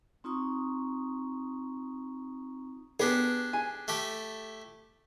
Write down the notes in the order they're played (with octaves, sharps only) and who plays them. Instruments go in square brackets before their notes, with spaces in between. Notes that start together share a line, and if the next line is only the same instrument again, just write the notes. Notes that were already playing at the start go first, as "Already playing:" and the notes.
[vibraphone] C4 D#4 F4 A#5 C#6 D#6
[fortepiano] B3 [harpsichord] D4 G4 G#4
[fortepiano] G#5
[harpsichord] A3 G4 A4